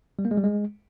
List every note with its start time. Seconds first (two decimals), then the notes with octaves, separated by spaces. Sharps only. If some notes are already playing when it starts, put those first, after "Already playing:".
0.19 G3
0.25 A#3
0.31 G#3
0.37 G3
0.44 G#3